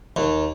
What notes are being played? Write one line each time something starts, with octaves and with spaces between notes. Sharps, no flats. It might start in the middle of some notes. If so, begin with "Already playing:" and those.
D#2